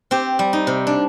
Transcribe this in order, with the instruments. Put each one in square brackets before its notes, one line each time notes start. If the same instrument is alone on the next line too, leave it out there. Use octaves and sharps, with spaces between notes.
[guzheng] C4 G4
G3
D#4
C3
D4